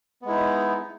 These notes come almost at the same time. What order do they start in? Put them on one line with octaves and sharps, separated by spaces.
B3 G#3 E4 D#4